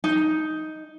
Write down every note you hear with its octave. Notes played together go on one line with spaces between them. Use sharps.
D#4